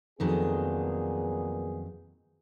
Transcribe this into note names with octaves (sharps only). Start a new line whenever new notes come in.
F2 A#2 D#3 F#3 B3 G#4